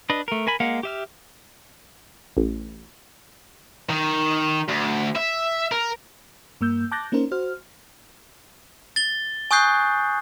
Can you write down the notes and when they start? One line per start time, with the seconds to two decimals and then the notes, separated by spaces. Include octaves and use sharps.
0.10 D4 B4 D#5
0.28 A3 A#4
0.47 A#4 G#5 B5
0.60 G#3 A#3 F5 F#5
0.83 G4 E5 F6
2.37 A1
3.89 D#3
4.68 D2
5.16 E5
5.72 A#4
6.61 G2 A#3 E6 G6
6.92 A5 D6 F#6 G6 A6 A#6
7.12 A#3 C#4 D#4 A#4 C5
7.31 F#4 C5 F6
8.96 A6 G7
9.51 G#5 C#6 D#6 F#6 G6 C7